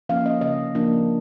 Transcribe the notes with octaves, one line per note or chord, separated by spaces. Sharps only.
F3 A#3 C#4 F5
D#5
C#3 D#5
F3 A#3 D4